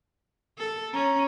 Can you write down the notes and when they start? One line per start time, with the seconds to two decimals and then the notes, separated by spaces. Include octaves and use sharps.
0.58 A4
0.93 C#4 A#5